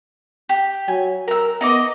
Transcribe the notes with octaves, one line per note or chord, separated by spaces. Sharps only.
G4
F#3 G#5
A#4 A#5 E6
B3 D#4 D#5 D6